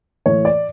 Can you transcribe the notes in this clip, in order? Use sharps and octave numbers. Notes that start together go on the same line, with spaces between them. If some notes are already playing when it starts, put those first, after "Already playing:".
A2 E3 C#5
D5